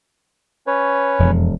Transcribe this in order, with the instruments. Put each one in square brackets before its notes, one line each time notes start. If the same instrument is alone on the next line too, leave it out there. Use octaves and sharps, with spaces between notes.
[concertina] C#4 B4 C#5
[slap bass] E1 [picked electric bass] F2